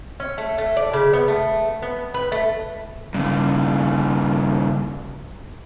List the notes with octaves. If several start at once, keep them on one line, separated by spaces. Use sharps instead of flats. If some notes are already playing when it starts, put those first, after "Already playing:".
C#4
A3
A3
D5
C#3
B3
A3
B3
B4
A3
G2 C#3